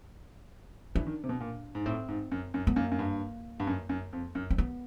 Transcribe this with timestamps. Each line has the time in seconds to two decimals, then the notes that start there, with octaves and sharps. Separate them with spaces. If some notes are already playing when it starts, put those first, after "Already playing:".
0.95 E3 D4
1.07 D#3
1.24 C3
1.29 B2
1.40 A#2
1.75 G#2
1.86 A2 C4
2.09 G#2
2.32 F#2
2.54 F#2
2.67 B3
2.76 F#2 A#3
2.92 F#2
2.99 G2
3.60 G2
3.67 F#2
3.89 F#2
4.13 F2
4.35 F#2
4.50 C4
4.58 B3